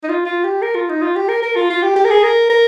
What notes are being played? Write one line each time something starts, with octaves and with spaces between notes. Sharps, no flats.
D#4
F4
F4
G4
A#4
F4
D#4
F4
G4
A#4
A#4
F4
F4
G4
G4
A#4
G#4
A#4
A#4